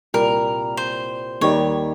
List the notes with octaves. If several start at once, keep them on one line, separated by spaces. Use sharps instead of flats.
C2 A#2 G3 A#4
C5
D#2 D#3 G3 C#5